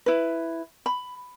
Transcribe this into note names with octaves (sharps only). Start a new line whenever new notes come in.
E4 B4
B5